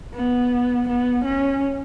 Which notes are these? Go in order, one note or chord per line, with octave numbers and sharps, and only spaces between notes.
B3
B3
C#4